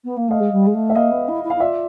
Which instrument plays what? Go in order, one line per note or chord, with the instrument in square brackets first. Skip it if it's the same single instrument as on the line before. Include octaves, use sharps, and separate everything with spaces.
[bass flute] B3
A#3
[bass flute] A3 [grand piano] D#5 F5
[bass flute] G#3
G3
G#3
A3
[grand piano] E5
[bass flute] A#3 [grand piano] D#5 F5
[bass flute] B3
E4
E4
[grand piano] F5
[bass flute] E4
[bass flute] F4 [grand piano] D5 E5